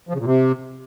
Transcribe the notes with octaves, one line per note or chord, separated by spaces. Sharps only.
F3
C#3
A#2
C3